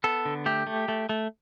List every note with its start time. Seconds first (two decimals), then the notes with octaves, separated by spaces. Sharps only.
0.04 B3 A4
0.25 D3
0.46 A3 G4
0.67 A3
0.88 A3
1.09 A3